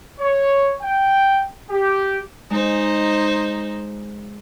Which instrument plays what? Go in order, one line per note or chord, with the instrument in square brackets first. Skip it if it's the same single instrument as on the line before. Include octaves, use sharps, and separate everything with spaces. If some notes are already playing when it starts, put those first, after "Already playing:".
[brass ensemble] C#5
G5
G4
[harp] G#3 [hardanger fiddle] D#4 C5